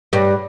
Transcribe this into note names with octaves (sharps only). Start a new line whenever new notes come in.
G2 G3